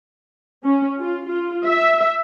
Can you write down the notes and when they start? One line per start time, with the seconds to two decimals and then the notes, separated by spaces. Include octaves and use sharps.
0.64 C#4
0.99 F4
1.27 F4
1.66 E5